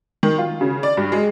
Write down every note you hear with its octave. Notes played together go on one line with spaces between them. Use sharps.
D#3
F4
C#3
D5
G2
G#3